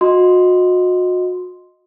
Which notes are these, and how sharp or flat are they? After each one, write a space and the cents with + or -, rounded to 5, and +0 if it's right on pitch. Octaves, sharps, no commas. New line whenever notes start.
F#4 -30 D#5 +0 C6 +0